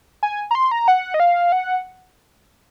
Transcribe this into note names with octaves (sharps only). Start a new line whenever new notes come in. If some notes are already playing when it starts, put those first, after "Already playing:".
G#5
A#5
C6
A#5
F#5
D#5
F5
F#5